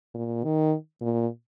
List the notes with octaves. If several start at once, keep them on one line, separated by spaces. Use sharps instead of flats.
A#2
D#3
A#2